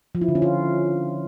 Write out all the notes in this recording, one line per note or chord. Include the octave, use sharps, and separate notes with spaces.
F3
E4
D3
C#4
F4